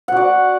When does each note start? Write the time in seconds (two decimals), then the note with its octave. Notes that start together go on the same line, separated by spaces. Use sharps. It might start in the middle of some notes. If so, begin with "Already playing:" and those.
0.08 F#5
0.12 F#4
0.17 D5